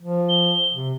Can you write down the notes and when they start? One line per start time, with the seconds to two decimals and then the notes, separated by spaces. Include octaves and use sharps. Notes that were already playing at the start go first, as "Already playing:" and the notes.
0.01 F3
0.29 G7
0.75 C3